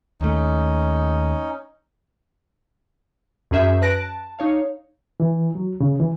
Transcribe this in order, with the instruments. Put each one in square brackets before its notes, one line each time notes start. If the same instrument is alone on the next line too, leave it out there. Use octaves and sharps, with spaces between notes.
[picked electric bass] D#2 A3 [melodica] C#4 D#4
[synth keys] F#2 C#4 G#4 E5 G6
B4 A5 F#6 A#6 D7
A5
D#4 C#5 F5
[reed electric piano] E3
F#3
C#3
E3